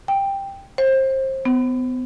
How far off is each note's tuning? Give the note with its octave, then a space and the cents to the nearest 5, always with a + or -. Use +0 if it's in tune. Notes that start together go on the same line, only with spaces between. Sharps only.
G5 +5
C5 +25
B3 +35